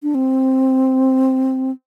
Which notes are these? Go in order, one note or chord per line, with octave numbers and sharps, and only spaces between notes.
D4
C4